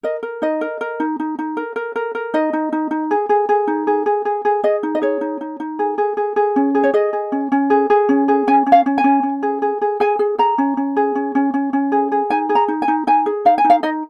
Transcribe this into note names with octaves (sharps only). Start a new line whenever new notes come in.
A#4 D#5
A#4
D#4 D#5
A#4
A#4
D#4
D#4
D#4
A#4
A#4
A#4
A#4
D#4 D#5
D#4
D#4
D#4
G#4
G#4
G#4
D#4
G#4
G#4
G#4
G#4
G#4 D#5
D#4
D#5
G#4 C#5
D#4
D#4
D#4
G#4
G#4
G#4
G#4
C#4
G#4
C#5
G#4 D#5
G#4
C#4
C#4
G#4
G#4
C#4
G#4
C#4 G#5
C#4
F5
C#4
G#5
C#4
C#4
G#4
G#4
G#4
G#4 G#5
G#4
G#4 A#5
C#4
C#4
G#4
C#4
C#4
C#4
C#4
G#4
G#4
D#4 G#5
G#4
A#5
D#4
G#5
D#4
D#4 G#5
G#4
D#4 F5
G#5
D#4
F5
D#4 D#5